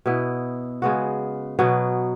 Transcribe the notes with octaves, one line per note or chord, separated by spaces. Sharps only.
B2 B3 E4
C#3 G#3 B3 F#4
B2 F#3 B3